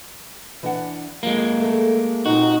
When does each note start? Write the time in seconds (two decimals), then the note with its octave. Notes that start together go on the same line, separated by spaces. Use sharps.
0.63 E3 D4 F#5
1.23 F2 G#3 A#3
1.60 A3 A4
2.26 A#2 C4 D#4 F#4